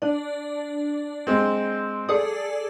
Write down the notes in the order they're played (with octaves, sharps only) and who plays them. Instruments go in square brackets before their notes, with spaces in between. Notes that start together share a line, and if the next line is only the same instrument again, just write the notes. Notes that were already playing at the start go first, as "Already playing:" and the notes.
[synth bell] D4 D5
[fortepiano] G#3 C4
[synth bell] G#4 A4 D5 [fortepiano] D#6